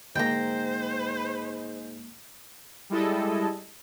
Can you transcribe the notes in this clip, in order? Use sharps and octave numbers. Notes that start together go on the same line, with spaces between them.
D2 G#2 G#3 A#3 C5 G5 A#5
G3 G#3 E4 A4 D#5